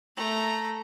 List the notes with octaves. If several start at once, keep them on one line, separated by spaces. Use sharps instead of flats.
A3 A#5